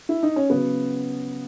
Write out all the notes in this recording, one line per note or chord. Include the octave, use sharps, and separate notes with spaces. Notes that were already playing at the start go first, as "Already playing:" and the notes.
E4
D#4
C#4
C#3 F#3 B3